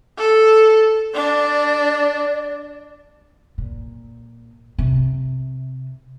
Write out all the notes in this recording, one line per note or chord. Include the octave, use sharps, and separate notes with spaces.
A4
D4 D5
A#2
C3